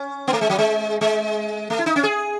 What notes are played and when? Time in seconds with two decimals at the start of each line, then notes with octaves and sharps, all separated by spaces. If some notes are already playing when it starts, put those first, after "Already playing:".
Already playing: C#4
0.27 B3
0.33 A3
0.41 G#3
0.50 F#3
0.58 G#3
1.01 G#3
1.70 A3
1.79 E4
1.86 D#4
1.96 C#4
2.03 G#4